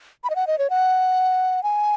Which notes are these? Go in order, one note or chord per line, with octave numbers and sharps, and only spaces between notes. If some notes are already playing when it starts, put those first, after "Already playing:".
B5
D#5
F#5
D#5
C#5
F#5
G#5